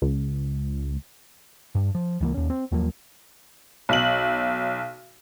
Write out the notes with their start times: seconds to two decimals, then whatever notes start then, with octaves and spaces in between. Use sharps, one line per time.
0.02 C#2
1.75 G2
1.95 F3
2.21 C#2 E3 A#3
2.34 D#2 C#4
2.50 C4
2.72 D#2 F3 F#3 A#3
3.89 B1 F#7